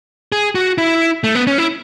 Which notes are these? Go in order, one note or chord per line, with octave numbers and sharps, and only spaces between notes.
G#4
F#4
E4
A3
B3
C#4
E4